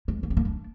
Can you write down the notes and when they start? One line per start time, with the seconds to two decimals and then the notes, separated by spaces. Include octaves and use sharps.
0.08 G#3
0.23 A#3
0.30 C4
0.37 A#3
0.45 D4